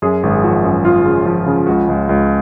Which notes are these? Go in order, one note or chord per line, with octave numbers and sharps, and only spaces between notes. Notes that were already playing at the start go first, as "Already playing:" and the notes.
F#2 G#4
G#1
G#4
F3 F#4
F#2
F3 F4
C#3
F3 F4
C#3
C#2 F#4
C#2
C#2